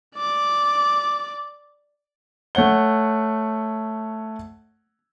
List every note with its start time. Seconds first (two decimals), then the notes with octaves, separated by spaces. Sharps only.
0.16 D5 D6
2.55 A3 C#5 F#5 G7